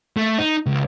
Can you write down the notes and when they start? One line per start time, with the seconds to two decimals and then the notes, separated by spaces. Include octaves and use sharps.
0.17 A3
0.38 D#4
0.66 C#2